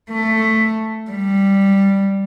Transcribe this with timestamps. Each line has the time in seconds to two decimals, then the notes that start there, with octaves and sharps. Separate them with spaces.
0.11 A3
1.11 G3